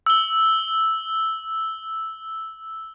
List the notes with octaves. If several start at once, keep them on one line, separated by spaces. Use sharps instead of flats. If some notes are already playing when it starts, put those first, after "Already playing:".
E6 G7